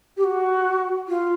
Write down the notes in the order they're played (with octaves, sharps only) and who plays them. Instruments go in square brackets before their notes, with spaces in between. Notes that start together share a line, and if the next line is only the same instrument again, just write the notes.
[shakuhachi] G4
F#4
F4